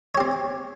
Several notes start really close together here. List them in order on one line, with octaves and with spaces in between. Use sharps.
C#5 G4 C4